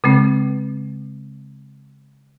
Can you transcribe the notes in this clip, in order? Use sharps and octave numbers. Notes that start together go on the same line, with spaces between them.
C#3 G#3 C4